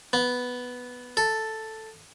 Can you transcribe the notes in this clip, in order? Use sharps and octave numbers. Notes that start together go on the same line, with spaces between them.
B3
A4